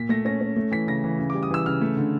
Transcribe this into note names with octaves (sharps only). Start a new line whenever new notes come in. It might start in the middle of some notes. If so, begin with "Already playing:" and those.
Already playing: A#2 B6
A3 A#6
C#4 A#6
C#4
A3
E3 B6
C#3 A#6
E3
C#3
G3 D6
D#6
E3 E6
C#3 F6
A3
D3